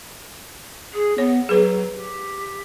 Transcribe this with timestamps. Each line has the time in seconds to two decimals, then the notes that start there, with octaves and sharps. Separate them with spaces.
0.94 G#4
1.18 B3 C#5
1.49 F#3 G#4 B4
1.94 G4